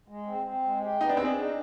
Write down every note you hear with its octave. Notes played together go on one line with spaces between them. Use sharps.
G#3
C4
C4
G#3
G4
B3 D#4
D4
C4 G#4
D4
D#4